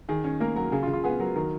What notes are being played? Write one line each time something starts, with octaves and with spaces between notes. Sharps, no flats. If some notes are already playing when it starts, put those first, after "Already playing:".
D#3 G#4
C#4
A#3 A#4
F#3 A#4
C#3 G#4
F4
C#3
F4
B3 G#4
F#3 A#4
D#3 A#4